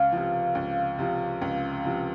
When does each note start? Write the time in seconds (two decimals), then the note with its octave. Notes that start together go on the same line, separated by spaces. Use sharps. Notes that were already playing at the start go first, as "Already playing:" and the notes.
Already playing: C#2 F5
0.12 C3 F3
0.55 C#2
0.99 C3 F3
1.42 C#2
1.85 C3 F3